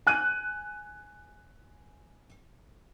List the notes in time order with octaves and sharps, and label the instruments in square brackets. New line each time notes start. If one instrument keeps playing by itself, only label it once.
[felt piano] G#5 F#6 D#7